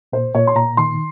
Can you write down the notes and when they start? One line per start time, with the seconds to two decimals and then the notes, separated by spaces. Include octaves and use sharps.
0.13 A#2 C5
0.35 A#2 C#5
0.47 C6
0.56 A#2 A#5
0.77 D#3 C6